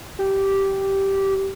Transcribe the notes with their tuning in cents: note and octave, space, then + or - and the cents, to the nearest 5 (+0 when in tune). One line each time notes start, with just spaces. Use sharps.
G4 -10